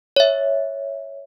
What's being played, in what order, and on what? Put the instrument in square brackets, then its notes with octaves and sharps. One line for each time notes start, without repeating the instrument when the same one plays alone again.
[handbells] C#5 E5